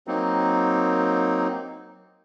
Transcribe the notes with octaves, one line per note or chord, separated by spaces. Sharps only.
F#3 A#3 C4 D#4